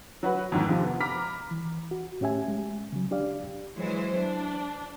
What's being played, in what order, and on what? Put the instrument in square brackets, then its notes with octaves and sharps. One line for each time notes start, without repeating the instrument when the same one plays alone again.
[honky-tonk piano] F#3 F#4 B4
F2 G#2 D#3 E3
F2 C3 F3
B3
A#5 B5 D6 F6 B6
[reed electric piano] E3
F#4
A2 C#4 G4 E5 G#5
G#3
C#3 F#3
D4 G4 D5 F5
[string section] E3 F#3 G#3 C5
D4